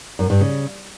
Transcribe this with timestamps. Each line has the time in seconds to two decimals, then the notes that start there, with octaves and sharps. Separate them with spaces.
0.19 F#2
0.30 G2
0.41 C#3